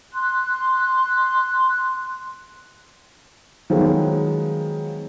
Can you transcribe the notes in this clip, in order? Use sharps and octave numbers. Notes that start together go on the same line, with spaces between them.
C6 F#6
D#3 F3 F#3 G#3 B3